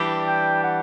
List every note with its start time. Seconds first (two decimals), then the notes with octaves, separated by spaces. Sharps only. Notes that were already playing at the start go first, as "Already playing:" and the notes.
Already playing: E3 G3 D4 G4
0.26 G5
0.63 F#5